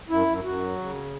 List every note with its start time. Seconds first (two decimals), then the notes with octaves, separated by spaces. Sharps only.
0.10 F#2 E4
0.27 F#2
0.44 F#2 F#4
0.61 F#3
0.77 C#3